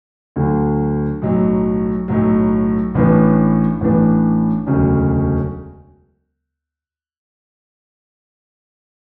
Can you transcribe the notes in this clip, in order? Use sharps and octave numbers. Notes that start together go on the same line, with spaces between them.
D2 D3 F#3
B1 A2 F#3
B1 A2 F#3
A1 A2 E3 B3 D4
A1 A2 E3 B3 D4
E1 D2 C#3 F#3 C#4